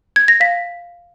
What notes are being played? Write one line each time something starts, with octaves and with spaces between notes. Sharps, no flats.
G#6
A#6
F5 B6